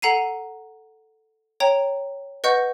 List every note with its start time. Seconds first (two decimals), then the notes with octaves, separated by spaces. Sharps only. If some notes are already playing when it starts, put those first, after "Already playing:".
0.02 A4 F#5 A#5 C7 D#7
1.60 C#5 G5 A#5
2.44 B4 D#5 F#5 C#6 G6